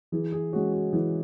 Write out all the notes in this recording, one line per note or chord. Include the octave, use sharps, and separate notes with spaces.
E3 G#4
G#4
G#3 C#4 F#4
F#4
E3 G#4